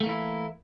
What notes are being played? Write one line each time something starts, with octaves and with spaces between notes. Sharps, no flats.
E3 A3 A#3 E4